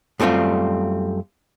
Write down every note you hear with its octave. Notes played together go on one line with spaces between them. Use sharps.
F#2 G3 A3 C4 F4